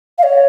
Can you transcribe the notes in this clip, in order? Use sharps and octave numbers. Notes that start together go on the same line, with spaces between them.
F5
C#5